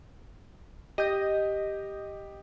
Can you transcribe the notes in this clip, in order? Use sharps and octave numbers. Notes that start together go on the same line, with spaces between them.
G4 D#5 G6